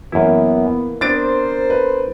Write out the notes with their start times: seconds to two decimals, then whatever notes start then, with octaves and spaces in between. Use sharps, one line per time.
0.12 F#2 E3 A#3 B3 E4
1.01 B3 C4 D4 A#4 C5 A6 D7
1.70 B4